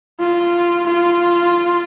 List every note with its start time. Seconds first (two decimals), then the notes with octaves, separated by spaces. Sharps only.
0.20 F4
0.87 F4